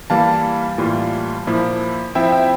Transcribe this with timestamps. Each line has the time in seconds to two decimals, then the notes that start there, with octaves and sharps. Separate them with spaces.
0.10 E3 G3 A#3 E4 F5 A5
0.78 A2 E3 G3 A#3 F4
1.47 A#2 F3 A#3 E4
2.15 F3 C4 E4 E5 G5
2.32 E5 G5